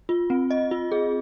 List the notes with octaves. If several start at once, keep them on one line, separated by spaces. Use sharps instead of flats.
F4
C4
D#5
F4
G#4